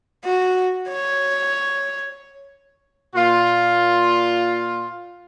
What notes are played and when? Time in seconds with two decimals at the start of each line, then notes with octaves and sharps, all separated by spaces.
0.24 F#4
0.89 C#5
3.16 A#2 F4